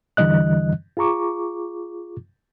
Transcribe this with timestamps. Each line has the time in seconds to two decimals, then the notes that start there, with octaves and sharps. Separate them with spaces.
0.17 E2 D3 E3 G3 D#5 F#6
0.97 F4 G#4 A#5 C#6 D6